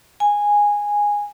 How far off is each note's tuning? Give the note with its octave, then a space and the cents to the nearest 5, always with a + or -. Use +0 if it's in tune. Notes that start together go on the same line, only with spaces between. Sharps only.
G#5 -10